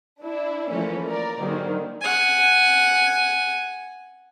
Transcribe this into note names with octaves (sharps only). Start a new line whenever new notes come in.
D4 E4 D5
E3 F3 A3 A#3 C#4 B4
A#4 D5
G#2 D3 D#3 F#3 G3 A#3
F#5 G#5